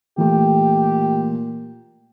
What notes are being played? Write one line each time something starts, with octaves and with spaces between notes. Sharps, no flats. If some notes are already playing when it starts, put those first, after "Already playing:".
A#2 E3 A3 G4